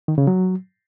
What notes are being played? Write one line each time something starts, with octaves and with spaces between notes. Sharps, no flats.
D#3
C#3
F#3